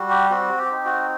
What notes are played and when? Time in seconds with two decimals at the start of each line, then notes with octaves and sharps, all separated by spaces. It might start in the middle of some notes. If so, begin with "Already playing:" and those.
Already playing: G3 F#4
0.10 G4
0.30 C4 F#4
0.58 G4
0.72 D#4
0.85 F#4